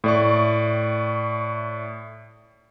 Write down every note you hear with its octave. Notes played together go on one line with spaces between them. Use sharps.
A2 D5 C#6